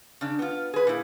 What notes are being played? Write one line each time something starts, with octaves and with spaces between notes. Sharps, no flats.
C#3 D4
B3 F4
G#4 B4
A#2 E4